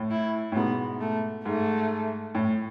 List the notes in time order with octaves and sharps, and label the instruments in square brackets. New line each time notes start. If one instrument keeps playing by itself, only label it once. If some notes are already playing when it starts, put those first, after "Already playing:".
Already playing: [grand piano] A2
[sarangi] E4
[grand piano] A2
[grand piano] G#2 B2 [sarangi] B3
[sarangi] A3
[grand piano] G#2 [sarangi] A3
[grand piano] A2